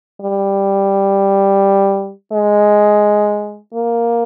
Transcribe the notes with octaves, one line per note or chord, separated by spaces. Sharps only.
G3
G#3
A#3